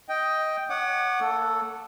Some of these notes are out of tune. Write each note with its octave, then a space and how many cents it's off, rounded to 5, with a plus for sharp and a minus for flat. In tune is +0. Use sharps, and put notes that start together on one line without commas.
D#5 +10 G5 +0
C#5 +25 F#5 +0 D6 +45
A#3 -35 A4 +0